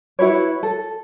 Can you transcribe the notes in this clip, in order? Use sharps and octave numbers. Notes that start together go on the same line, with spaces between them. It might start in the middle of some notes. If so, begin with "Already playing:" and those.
E4 F#4 B4 C#5
A4